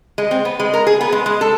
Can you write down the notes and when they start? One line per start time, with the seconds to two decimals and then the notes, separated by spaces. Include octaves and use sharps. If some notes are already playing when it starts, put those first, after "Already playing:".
0.18 G#3
0.31 C4
0.45 B3
0.60 G#3
0.74 A#4
0.87 G#4
1.01 B3
1.12 G#3
1.26 G#3
1.41 A4